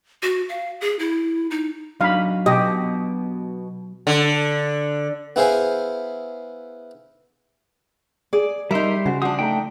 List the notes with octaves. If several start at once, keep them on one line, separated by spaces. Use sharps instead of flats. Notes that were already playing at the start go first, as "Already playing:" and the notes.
F#4
F5
G#4
E4
D#4
F#3 D4 D#4 F5 B5
B2 G4 D#5
D3
B3 E4 G#4 C5 F5 G#5
G#4 D5
G3 D#4 A#4 E5 C6
C#3 F#4 C5
F3 D4 F#4 D#6
A3 D#4 G5 A#5